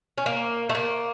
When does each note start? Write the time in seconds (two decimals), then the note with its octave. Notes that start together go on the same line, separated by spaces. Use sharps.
0.18 C#4
0.26 A#3
0.69 A3
0.75 A#3